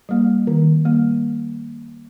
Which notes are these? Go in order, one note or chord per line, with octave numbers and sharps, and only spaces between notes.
G3 A#3
D#3
G3 A#3